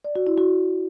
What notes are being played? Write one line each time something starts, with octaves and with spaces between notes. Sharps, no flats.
D5
F#4
E4
F#4